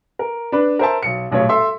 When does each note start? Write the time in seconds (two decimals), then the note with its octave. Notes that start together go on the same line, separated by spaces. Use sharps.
0.19 A#4
0.52 D4 B4
0.79 A#4 C5 E5 A5
1.03 B1 C#7
1.31 D#1 B1 A2 C#5
1.49 A4 E5 C6